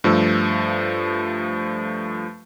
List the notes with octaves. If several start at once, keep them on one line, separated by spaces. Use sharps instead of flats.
G2 F3 A3 E6